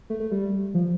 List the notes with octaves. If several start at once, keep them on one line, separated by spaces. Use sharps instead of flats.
A3
A3
G3
F3